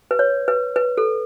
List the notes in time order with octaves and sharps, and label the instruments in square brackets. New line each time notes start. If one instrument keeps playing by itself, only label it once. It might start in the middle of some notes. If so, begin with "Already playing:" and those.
[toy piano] B4
C#5
B4
B4
A4